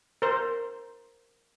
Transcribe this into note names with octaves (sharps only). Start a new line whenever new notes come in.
A#4 C5